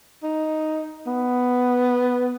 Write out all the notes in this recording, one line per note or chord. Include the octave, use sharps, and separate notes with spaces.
D#4
B3